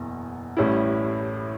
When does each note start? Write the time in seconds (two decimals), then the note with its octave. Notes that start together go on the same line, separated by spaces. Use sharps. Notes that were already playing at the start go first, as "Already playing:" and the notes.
Already playing: F#1 E2 B2
0.57 A1 A2 G3 C#4 E4